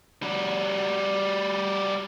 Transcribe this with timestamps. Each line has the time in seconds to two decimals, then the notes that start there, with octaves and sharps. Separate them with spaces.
0.23 G3 F#4